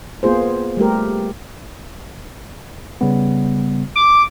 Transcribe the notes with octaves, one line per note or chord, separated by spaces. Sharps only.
A#3 B3 F4 G#4 C5
G3 A3 G4 A#4
C#3 G3 B3
D6